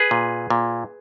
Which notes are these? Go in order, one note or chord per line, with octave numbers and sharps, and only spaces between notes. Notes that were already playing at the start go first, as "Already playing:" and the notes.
Already playing: G#4 B4
A#2
A#2